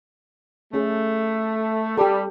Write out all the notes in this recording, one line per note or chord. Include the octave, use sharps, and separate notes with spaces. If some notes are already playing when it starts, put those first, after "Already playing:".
A3 C#4 G#4
G3 G4 A4